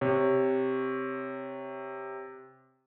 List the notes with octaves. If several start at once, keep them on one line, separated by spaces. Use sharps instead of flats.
C3 C#5